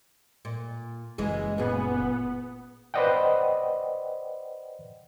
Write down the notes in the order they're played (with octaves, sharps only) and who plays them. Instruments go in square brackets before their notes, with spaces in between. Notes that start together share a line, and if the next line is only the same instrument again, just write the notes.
[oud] A#2
[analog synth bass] F#1 [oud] E3 G#3 G#4
[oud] A#2 G#4 [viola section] B3
[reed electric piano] B4 C5 D5 D#5 F#5 G5